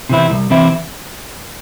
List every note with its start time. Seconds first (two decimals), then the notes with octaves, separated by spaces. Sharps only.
0.09 C3 E3 C4 E4
0.30 C2
0.50 C3 E3 C4 E4